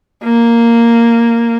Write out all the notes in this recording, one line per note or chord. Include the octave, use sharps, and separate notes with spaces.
A#3